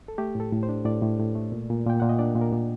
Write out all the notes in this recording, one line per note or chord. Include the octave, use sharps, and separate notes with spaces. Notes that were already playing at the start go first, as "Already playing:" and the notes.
A4
A3 G4
A2 A4
A2
C5
D4
A2 D5
A2
A2
A3
A#2
A#2
A#2 G5
A#2 F#5
D#5
D4 D5
A#2
A#4
A#2